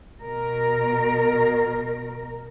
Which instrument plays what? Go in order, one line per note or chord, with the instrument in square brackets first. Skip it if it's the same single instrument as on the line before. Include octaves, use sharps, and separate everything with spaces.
[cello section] B2 A#4